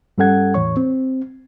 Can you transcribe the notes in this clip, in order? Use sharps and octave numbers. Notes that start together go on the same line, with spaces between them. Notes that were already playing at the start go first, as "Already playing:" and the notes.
G2 G3 C#4 A4 F#5 G#6
E2 A2 E3 C#5 C#6
C4